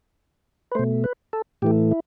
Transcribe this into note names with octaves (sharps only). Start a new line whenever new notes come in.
B4
B2 A3 C5
B4
A4
A2 E3 A3 G4
E4